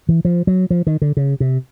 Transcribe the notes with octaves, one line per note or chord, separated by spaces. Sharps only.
E3
F3
F#3
F3
D#3
D3
C#3
C3